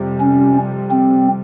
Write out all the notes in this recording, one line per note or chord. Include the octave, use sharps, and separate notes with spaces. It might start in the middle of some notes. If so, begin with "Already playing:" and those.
Already playing: F2 C3 G3
C#4
C4